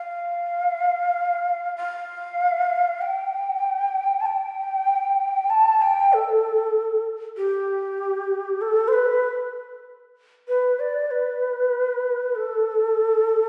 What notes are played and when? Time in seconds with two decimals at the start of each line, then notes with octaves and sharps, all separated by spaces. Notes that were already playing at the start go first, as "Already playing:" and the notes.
Already playing: F5
1.77 F5
3.01 G5
4.20 A5
4.26 G5
5.50 A5
5.82 G5
6.13 A4
7.37 G4
8.61 A4
8.88 C5
8.93 B4
10.48 B4
10.79 D5
11.11 B4
12.35 A4